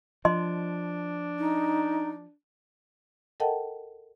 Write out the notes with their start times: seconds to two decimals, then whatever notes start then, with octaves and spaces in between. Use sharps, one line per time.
0.25 F3 D4 D#5 C6
1.39 D#4
3.40 A4 A#4 D#5 F#5 G5 A5